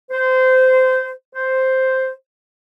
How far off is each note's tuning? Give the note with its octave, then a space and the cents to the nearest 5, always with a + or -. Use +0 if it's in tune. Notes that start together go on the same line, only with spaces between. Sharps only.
C5 -20
C5 +0